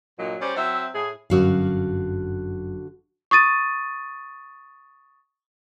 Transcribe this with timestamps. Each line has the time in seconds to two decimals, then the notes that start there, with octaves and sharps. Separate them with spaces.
0.18 G2 A#2 F#3 D#5
0.41 G3 C#4 C5 D5
0.56 F#3 C4 E5
0.94 A2 G#4
1.30 G1 F#2 D3 F#4 F5
3.31 C#6 D#6 A6 D#7